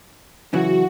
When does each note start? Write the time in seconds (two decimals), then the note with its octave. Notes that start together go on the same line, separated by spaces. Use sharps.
0.53 F#2 C#3 E3 F#4